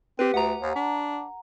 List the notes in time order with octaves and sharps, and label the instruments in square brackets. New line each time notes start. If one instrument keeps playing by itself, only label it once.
[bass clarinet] C4 [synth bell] G4 B4
[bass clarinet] D2 [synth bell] F#5 A#5
[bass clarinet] D#2
D4